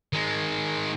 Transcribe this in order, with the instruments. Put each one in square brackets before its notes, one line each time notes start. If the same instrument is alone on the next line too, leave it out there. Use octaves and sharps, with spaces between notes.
[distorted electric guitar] D#3 G#3